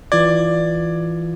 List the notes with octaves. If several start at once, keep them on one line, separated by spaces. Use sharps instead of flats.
E3 F4 D5 G#6